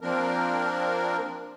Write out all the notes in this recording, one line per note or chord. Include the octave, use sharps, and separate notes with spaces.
F3 A#3 C4 D4 A#4